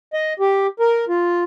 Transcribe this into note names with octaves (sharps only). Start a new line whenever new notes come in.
D#5
G4
A#4
F4